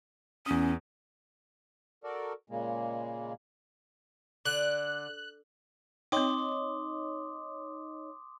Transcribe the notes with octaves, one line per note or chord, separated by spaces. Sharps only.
E2 C#4 D#6
F#4 A4 A#4 D5
A#2 C#3 G#3 A#3
D3 F#6
C4 D#4 C#5 D#5 G5 C6 D6 D#6